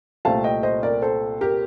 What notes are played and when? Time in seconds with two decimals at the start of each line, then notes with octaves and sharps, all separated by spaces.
0.25 C2 A#2 A3 C4 F5 A5
0.44 D#5 G5
0.63 C5 D#5
0.83 A#4 D5
1.02 A4 C5
1.41 G4 A#4